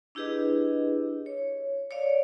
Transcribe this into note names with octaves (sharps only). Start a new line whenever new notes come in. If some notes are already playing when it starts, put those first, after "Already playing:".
D4 E4 G4 G#4 B4 D#5
C#5
C#5 D5 F5